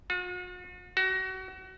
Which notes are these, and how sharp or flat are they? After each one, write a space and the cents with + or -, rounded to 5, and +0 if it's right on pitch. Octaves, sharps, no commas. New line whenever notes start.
F#4 -45
F#4 +30